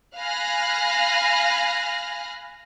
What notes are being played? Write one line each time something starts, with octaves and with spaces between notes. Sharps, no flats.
F5 G#5 B5 F6 F#6 A#6